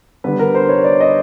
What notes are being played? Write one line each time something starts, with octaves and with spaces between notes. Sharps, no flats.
D3 G3 B3 B4
A#4
C5
C#5
D5
D#5